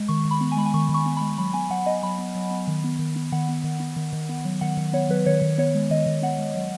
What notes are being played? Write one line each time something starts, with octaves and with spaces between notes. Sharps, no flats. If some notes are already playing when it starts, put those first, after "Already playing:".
Already playing: G#3
D#3 C#6
D#3
B5
B3
G#5
G#3 B5
G#5
D#3 C#6
D#3
C#6
B3
G#3 B5
F#3 B5
B3 G#5
F#3 F#5
B3 D#5
F#3 B5
B3
F#3
B3
D#3
B3
D#3
B3
D#3 F#5
B3
D#3
B3
D#3
D#3
B3
F#3
D#3 F#5
D#3
B3 C#5
F#3 B4
D#3 C#5
D#3
B3 C#5
G#3
D#3 D#5
D#3
B3 F#5
G#3
F#3